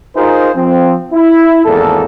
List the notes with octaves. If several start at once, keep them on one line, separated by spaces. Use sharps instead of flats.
D#4 F4 G#4 A#4 C5
F3 C4
E4
G#1 E2 A#3 A4